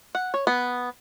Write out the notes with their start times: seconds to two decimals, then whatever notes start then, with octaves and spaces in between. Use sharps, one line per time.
0.15 F#5
0.34 C#5
0.47 B3